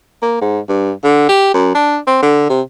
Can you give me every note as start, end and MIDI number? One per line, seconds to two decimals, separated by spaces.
0.22 0.38 58
0.41 0.59 44
0.69 0.91 43
1.04 1.28 50
1.29 1.53 67
1.54 1.73 42
1.75 1.98 62
2.07 2.19 60
2.22 2.46 50
2.49 2.61 48